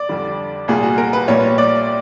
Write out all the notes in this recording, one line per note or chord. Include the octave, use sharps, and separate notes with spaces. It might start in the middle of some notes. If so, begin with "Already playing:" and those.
Already playing: D5
F2 D3 G3
C2 A#2 G3 G#4
F#4
A#4
B4
A#1 A#2 G3 C#5
D5